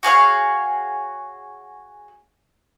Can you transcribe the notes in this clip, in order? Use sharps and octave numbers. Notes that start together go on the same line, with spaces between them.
F#4 G#4 C#5 F5